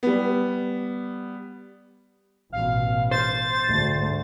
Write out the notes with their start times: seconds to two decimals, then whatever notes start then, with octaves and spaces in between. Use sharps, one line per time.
0.03 G3 B3
2.52 A1 B2 F5
3.11 C5 A6
3.66 D2 G#2 A3